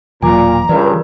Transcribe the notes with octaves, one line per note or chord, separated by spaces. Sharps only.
E1 A#2 E3 F#3 G#5 A#5 D6
C#2 G2 E3 A#4 B4 D5